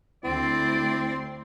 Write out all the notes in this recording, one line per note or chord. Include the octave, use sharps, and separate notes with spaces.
D2 C4 E4 D5 C6